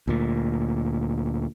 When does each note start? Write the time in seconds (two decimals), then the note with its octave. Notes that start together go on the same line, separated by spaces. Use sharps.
0.07 D2 A#2